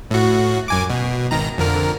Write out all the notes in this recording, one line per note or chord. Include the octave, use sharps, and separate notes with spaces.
A2 F#4
F#2 G#5 D6
B2
G#1 D#3 A#5
F2 D3 A#4